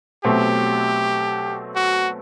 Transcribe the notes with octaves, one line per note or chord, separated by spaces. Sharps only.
B2 F#3 A3 C4 G4
F#4